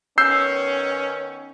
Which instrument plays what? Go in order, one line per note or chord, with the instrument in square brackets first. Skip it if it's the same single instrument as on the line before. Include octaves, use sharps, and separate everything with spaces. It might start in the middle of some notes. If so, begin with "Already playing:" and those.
[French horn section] D#3 B3 C#4 [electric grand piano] E6 G6 C7